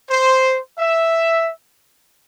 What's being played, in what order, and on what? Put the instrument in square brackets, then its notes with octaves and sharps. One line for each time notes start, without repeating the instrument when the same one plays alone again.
[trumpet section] C5
E5